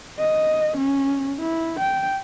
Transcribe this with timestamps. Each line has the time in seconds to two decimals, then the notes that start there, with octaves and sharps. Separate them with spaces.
0.19 D#5
0.77 C#4
1.39 E4
1.80 G5